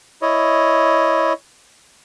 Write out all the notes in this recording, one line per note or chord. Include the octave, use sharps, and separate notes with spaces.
E4 C#5 D#5